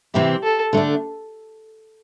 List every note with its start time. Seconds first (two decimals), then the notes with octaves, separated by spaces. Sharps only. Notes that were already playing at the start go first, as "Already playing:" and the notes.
0.14 C3 E3 C4 E4 G4
0.43 A4
0.73 D3 A3 D4